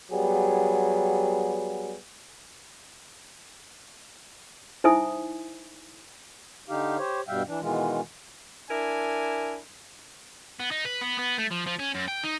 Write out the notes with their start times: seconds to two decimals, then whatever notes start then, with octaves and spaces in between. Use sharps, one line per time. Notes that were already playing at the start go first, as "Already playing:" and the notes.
0.11 F#3 G3 B3 G4 G#4
4.84 D#4 E4 C5 E5 G#5 D#6
6.69 D3 D#4 G4 F5
6.98 G4 C5 C#5
7.28 G2 B2 G3 E5 F5 G5
7.47 E3 D4
7.61 B2 D#3 E3 G#3 F4
8.70 D4 E4 A#4 G#5
10.60 B3
10.71 D#4
10.85 B4
11.01 B3
11.19 B3
11.38 A3
11.51 F3
11.67 F3
11.79 C#4
11.95 F#2
12.08 G5
12.24 D#4